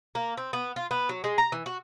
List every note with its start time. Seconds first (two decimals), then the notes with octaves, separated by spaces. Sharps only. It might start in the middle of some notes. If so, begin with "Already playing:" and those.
0.15 A#3
0.37 C4
0.53 B3
0.76 F4
0.91 B3
1.09 F#3
1.24 G#3
1.38 A#5
1.52 E3
1.66 F#4